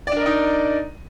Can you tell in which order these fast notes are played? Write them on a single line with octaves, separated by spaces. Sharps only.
D5 D4 A#4 D#5 D#4